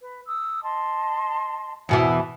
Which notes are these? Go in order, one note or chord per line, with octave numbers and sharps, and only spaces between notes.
B4
D#6 E6
D#5 A5 C6
E2 B2 E3 E5